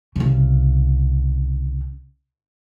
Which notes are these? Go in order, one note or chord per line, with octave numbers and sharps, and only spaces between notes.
C2 C#3